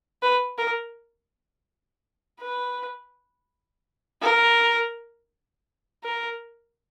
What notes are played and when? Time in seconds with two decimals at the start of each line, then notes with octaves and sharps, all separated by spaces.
0.22 B4
0.58 A#4
2.41 B4
4.22 A#4
6.04 A#4